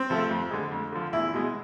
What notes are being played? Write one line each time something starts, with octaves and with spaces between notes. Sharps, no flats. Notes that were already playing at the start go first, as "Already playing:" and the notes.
Already playing: C4
C3 F3 A3
F2
D3 G#3
F2
D3 F3
E2 E4
B2 G#3